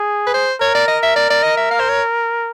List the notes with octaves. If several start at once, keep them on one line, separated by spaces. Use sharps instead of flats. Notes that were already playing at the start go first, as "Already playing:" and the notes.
Already playing: G#4
B4
C5
A#4 C#5
D5
D#5
E5
D5
D5
D#5
E5
F5
C5
C#5